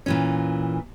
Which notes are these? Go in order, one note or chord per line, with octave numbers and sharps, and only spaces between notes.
A#2 E3 C#4